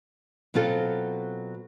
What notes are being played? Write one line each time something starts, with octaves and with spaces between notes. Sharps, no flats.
B2 F#3 C4 F4 A4